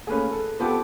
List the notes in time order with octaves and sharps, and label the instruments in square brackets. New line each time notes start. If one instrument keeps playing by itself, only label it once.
[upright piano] A3 A#3 C#4 [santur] G#4 B4
[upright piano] A4
[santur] F3 C4 D6 [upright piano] B3 G4 A4